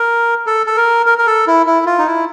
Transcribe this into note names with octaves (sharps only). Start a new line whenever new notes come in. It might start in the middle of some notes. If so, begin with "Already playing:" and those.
Already playing: A#4
A4
A4
A#4
A#4
A#4
A4
E4
E4
F4
D#4
E4